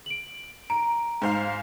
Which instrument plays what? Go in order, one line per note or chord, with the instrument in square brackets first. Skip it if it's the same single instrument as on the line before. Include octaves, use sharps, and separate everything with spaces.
[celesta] D7 F#7
[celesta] A#5 [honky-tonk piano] D7
[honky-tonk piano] G#2 C5 F5